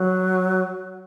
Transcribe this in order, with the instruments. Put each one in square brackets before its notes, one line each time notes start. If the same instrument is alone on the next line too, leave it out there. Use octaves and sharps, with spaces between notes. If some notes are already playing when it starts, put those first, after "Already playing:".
Already playing: [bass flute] F#3